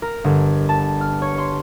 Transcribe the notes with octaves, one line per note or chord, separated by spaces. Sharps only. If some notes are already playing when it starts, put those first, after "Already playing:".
A#4
G1
A5
F6
C#5
C6